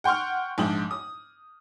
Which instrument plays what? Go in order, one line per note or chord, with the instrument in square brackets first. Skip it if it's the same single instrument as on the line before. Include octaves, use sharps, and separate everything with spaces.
[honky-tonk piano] F#5 G5 C6 C#6 F6
A#1 G#2 D4 G5 D#6 F#7
D#6